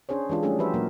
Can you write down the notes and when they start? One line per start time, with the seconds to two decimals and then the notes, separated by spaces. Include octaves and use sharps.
0.09 C#4 D4 G#4 C5 C#5
0.29 E3 G#3 D4 F4 G4
0.43 G3 A3 C#4 D4 G#4 A4
0.59 F3 F#4 G4 B4 C5 E5
0.74 A#2 F#3 A#3 A#4